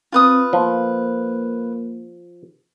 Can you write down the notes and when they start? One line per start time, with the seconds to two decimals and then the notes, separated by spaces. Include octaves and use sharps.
0.12 C4 F4 B4 D#6
0.53 F3 A#3